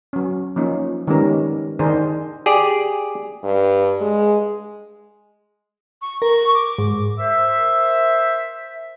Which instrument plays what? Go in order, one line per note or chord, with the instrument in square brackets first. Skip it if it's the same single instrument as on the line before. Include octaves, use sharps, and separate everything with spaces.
[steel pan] F#3 C#4
F3 A#3 C#4 D#4
D#3 G3 G#3 B3 C#4 A#4
D#3 D4 G#4 A#4 C5
[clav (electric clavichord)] G4 G#4 D5
[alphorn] G2
G#3
[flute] C#6
[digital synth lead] A#4 [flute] C#6
[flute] D6
[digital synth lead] G#2
[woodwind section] A#4 C5 E5